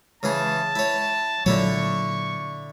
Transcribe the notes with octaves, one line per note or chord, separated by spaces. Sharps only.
C#3 E3 G#4 A5
E4 C#5
A#2 D3 F#3 E4 C#5 C#6